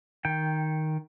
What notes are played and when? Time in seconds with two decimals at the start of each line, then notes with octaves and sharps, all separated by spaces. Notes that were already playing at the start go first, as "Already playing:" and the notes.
0.25 D#3 G5